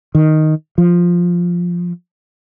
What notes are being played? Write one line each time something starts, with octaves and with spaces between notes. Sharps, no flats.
D#3
F3